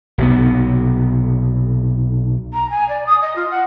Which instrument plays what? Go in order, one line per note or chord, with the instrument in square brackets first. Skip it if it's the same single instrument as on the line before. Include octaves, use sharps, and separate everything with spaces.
[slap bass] B1 C3 B3
[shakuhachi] A#5
G#5
D5
D#6
D#5
F4
F#5